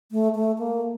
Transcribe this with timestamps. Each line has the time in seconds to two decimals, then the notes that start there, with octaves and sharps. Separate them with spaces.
0.12 A3
0.35 A3
0.58 A#3